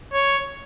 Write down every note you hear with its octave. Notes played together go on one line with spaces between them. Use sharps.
C#5